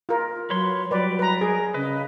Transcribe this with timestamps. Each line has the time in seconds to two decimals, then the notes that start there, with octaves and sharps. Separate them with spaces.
0.09 F4 A#4
0.50 F#3 B4 C#5 C6
0.91 F#3 G3 B4 D5
1.19 B4 A#5
1.41 G#4 A#4
1.74 C#3 B4 D#5